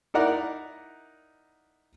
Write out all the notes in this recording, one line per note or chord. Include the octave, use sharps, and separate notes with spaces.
D#4 E4 A#4 D5 F#5 A#5